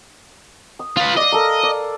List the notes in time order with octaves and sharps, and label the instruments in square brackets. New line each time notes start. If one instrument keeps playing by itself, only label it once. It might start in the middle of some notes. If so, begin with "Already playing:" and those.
[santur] D#6
[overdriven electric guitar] F4 B4
[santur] D5 F5 [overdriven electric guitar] D#5
[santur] A4 A#4
D5